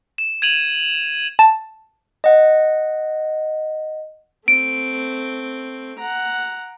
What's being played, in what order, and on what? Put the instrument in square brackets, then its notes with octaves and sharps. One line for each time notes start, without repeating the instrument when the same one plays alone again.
[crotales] E7
G#6 D#7 F7 F#7
[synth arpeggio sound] A5
[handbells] D#5 F#5
[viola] A3 C4 [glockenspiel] D7
[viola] F#5 A#5